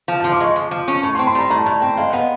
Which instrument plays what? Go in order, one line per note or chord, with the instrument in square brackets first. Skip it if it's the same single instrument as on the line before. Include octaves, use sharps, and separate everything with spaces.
[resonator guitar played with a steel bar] F3
[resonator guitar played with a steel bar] F3 [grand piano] A5
[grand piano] D6
[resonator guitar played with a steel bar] G#3 [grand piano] C#6
[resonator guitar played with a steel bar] F3
F3
C#4
[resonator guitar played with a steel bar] A2 [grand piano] C#6
[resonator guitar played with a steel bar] C4 [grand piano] C6
[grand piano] B5
[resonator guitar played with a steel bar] G3 [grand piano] A#5
[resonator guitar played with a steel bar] A2 [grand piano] A#5
[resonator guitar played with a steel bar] A2 [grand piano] A5
[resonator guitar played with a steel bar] C4 [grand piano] G5
[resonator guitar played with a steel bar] G#3 [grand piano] F5
[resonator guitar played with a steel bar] B3 [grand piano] D#5